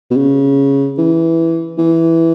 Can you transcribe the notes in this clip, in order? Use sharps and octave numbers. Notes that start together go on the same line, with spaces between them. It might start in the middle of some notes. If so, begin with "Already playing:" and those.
B2
C#3
E3
E3